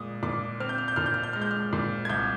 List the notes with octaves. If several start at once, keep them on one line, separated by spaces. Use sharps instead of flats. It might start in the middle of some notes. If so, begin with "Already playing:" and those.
Already playing: A#2 G#3 D#6
A#2 D6
C4 F6
G6
F6
G6
A#2 F6
G6
F6
G6
G#3 F6
G6
F6
A#2
G#6
C2 G6